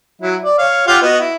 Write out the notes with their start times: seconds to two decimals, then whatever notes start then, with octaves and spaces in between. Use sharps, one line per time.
0.22 F#3 E4
0.44 D5
0.58 C#5 F5
0.87 F4 G4 F#5
1.02 B3 F#4 D#5
1.20 E4